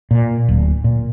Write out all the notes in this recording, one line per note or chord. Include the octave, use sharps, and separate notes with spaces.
A#2
D1
A#2